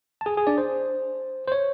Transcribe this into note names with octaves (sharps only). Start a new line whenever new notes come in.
A5
G#4 G#5
G#4 G#5
D4 D5
C5
C5
C#5